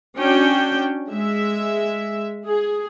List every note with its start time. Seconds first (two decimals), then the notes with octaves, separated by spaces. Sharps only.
0.17 C#4 D4 F#4 G5
1.10 G#3 E5
2.48 G#4